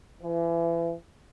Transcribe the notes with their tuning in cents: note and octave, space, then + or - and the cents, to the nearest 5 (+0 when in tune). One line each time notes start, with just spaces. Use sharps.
E3 +35